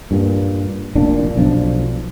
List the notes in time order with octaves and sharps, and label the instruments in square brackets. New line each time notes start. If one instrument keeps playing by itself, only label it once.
[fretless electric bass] G2 A#2
F1 A#2 D4
B1 F3 D4